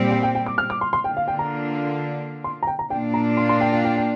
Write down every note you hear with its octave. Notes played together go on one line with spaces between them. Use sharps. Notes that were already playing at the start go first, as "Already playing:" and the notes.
Already playing: A#2 G3 C4 G4
G5
G5
G5
D6
F6
D6
C6
C6
D3 A#3 D4 F4 G5
F5
G5
A#5
C6
A#5
G5
A#5
A#2 A#3 D4 F4 G5
A#5
C6
C6
G5
G5
G5
G5